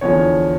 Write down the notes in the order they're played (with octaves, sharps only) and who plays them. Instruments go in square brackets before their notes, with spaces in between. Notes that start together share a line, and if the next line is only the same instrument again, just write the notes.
[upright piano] E2 D3 F3 C#5